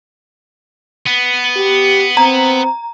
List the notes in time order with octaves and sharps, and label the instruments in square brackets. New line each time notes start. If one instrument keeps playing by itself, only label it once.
[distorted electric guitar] B3
[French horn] G4
[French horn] C4 [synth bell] A#5